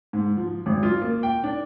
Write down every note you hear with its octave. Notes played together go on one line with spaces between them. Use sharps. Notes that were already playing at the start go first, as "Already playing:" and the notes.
G#2
F3
G#1
F4
A#3
G5
D4